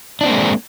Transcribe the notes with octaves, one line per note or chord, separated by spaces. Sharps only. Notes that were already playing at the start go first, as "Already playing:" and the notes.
G#3 A#3 C4 D4 D#4